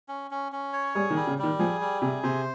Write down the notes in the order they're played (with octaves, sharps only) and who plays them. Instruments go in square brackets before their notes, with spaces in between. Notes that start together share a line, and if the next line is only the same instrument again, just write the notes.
[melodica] C#4
C#4
C#4
C#5
[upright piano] G3 [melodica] G#4
[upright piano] D#3
[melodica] G3
[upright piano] C#3
[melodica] G3
[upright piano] D#3
[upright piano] F3 [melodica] G#4
[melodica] G3
[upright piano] C3 [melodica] G#4
[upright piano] C3 [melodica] C5